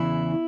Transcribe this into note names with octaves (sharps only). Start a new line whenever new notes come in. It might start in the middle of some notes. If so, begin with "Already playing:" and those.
Already playing: E2 C#3 E3 E4